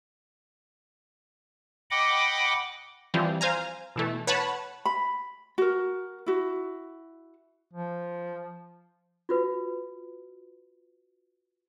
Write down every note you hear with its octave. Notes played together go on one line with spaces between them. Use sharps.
D#5 F#5 G5 B5 D6
E3 F3 G3 C4
C5 F5 G#5 A#5
B2 E3 A3
B4 C#5 F#5 A5 B5
B5
F#4 A#4
E4 F#4
F3
F4 F#4 B4